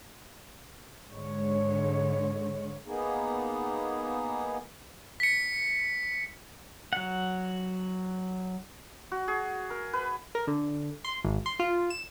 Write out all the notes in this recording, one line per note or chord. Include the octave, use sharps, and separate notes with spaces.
G#2 D3 G#3 C#5
A#3 B3 D#4 G#4
B6 C#7
F#3 F#5
F#4
G#4
A#4
B4
A#4
D3
C6
G#1
C6
F4
E7